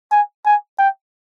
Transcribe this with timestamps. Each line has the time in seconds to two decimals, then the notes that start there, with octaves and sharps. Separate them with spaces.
0.11 G#5
0.46 G#5
0.79 G5